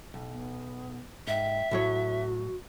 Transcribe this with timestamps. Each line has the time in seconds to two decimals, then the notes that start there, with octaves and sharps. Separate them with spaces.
0.14 B1
0.29 B3
1.27 G#2 E5 G5
1.71 A2 F#3 F#4 C#5